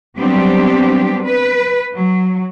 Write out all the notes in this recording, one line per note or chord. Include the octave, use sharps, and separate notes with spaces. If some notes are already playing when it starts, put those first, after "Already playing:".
F#3 G3 B3 C4 D4 G4
B4
F#3